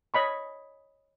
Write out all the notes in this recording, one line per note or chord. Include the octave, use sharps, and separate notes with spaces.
C#5 D#5 B5 C#6